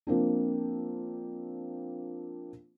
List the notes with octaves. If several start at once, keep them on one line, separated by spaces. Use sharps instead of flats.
F3 A#3 C4 D4